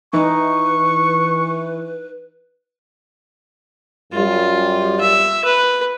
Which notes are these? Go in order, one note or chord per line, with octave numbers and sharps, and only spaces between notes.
E3 D#4 B4 C#6
F#2 G3 F4
E5
B4